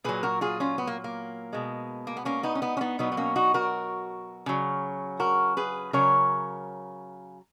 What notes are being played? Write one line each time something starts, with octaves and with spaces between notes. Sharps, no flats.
A#2 F#3 G#4 B4
F#4 A#4
F4 G#4
C#4 F4
B3
A#3
A#3
B2 G#3
A#3
B3
A#3 C#4
B3 D#4
C#4
B3 D#4
C#4
B3 D#4
B2 F#3 B3 D#4
B3
A#3 C#4
D#4 F#4
F#4 A#4
C#3 F#3
F#4 A#4
G#4 B4
C#3 F#3 A#4 C#5